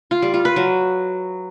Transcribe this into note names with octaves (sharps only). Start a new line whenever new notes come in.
F4
G3
F4
B4
F#3